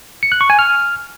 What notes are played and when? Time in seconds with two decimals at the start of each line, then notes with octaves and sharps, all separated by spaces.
0.23 C#7
0.32 F#6
0.41 C#6
0.50 G#5
0.59 F6